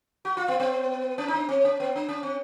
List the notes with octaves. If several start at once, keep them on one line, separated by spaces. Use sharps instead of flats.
F#4
F4
B3
B3
C#4
D#4
D4
C4
C#4
B3
D4
C#4
C4